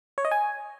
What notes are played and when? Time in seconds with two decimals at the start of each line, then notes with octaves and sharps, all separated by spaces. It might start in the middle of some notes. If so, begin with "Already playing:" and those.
0.18 C#5
0.25 D#5
0.31 G#5